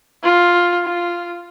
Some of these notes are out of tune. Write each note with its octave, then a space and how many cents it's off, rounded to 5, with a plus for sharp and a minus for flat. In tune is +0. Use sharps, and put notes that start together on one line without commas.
F4 +5
F4 -5